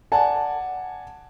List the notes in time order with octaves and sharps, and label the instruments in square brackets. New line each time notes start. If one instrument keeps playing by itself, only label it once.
[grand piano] D5 F#5 G#5 A5